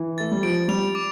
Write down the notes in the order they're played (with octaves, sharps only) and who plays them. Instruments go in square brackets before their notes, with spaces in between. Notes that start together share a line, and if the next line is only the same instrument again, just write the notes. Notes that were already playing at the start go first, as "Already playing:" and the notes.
Already playing: [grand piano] E3
[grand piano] A3 [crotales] A6
[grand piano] G3
[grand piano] F3 [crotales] D7
[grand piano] G3 [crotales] F7
[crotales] D6